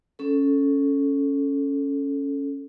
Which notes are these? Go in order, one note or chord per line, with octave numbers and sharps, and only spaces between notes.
C#4 A4